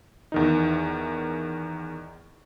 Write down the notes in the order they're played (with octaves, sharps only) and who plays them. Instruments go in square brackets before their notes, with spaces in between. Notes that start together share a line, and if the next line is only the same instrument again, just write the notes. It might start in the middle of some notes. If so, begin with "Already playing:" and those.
[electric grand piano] E2 D#3 D#4